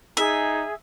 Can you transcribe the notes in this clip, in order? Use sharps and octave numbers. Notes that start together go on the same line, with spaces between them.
D#4 G#4 E5